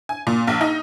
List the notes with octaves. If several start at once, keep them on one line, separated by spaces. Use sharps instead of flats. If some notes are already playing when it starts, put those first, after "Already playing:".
G#5
A#2
A#1
D#4